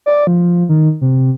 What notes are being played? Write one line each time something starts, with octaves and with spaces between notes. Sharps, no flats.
D5
F3
D#3
C3